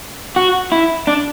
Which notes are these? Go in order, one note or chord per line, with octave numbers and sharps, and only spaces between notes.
F#4
E4
D4